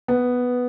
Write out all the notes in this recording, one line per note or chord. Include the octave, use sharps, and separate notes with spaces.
B3